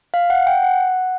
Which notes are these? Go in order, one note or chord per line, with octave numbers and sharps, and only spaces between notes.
F5
F#5
G5
F#5